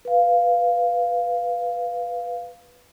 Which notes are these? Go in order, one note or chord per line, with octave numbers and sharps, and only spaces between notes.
B4 F5